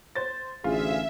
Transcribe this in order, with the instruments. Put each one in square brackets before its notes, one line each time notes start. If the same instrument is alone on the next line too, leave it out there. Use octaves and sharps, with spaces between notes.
[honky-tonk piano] C5 A6
[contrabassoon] A1 [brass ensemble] D2 G#4 [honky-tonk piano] F4 [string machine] E5